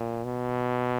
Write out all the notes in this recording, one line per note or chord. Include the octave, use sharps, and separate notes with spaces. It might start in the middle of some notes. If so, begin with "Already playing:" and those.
Already playing: A#2
B2